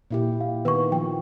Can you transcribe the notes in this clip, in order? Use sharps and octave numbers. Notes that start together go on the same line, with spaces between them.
A#2 E4 G4
F5
D#3 B3 B4 C#6
F3 G5